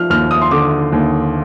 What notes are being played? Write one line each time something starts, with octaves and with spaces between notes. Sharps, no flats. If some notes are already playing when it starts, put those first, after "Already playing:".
Already playing: F3 F6
D#2 F6
D#6
C6
D3 D6
D#2